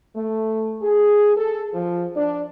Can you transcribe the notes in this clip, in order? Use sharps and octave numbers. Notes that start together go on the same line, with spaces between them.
A3
G#4
A4
F3
D4